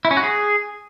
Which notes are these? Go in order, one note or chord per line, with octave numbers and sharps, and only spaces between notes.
E4
C#4
F#4
G#4